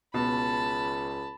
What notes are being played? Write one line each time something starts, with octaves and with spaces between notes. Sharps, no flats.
C#2 B2 A5 B5